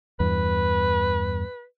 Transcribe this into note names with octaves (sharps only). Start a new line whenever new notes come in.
E2 G2 B4